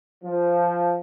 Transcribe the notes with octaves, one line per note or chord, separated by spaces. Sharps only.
F3